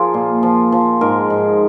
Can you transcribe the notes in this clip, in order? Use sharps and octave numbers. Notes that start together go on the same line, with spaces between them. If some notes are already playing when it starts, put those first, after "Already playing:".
Already playing: F3 F4 G#4 A#4
A#2
F3
F3
G#2 A#4
G#2